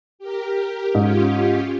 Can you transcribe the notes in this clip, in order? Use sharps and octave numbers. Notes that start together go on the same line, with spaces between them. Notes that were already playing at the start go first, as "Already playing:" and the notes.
G4 A#4
G#2 C#4 F4 G4